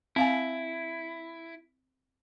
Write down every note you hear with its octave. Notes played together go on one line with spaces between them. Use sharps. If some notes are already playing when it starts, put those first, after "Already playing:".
C4 E4 F5 G#5